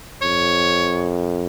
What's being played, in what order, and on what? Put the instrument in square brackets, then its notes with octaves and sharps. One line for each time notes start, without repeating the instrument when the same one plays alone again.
[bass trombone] F2 [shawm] C#5